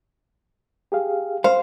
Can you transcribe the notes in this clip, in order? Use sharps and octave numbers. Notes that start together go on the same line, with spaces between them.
G4 G#4 F5
C5 F5